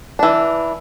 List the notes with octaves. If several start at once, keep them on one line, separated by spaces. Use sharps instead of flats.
E3 D4